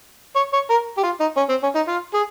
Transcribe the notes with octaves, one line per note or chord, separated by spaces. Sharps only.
C#5
C#5
A#4
G4
F4
D#4
C#4
C4
C#4
D#4
F4
G#4